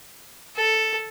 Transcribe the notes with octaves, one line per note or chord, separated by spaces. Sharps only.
A4